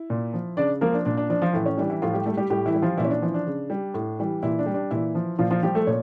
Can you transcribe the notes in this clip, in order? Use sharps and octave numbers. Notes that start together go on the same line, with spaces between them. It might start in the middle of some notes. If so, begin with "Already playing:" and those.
Already playing: E4
A#2
F3
C#3 D4 D5
F3 A#3 A#4
D4
A#2 D4
D4
F3 D4
F3 F4
A2 E3 E4
C#4
E3 G3 D4
E3 E4
A2 F3 F4
G3 G4
G3 A3 A4
G3 G4
A2 G3 G4
E3 E4
G3
F3 F4
A#2 E3 E4
C#4
D4
E3 F3 E4
D4
C#3
G3
A2
E3 G3
A#2 E3 E4
D4
G3
D4
A#2 E3 E4
F3
A#2 F3 F4
F3 F4
F3 G3 G4
A3 A4
A#2 C#5